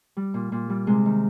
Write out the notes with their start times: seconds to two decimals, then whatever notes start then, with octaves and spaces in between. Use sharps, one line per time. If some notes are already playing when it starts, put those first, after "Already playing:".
0.17 G3
0.34 A#2
0.52 A#2
0.69 G3
0.87 C3 G#3
1.06 D#3